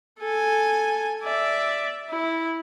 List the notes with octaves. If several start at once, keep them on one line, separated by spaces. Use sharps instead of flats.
A4 G#5
D5 E5
E4